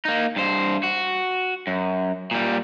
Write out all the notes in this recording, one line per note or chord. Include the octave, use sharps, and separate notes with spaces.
A#3 D#4
G2 C5
F#4
F#2
A#2 G3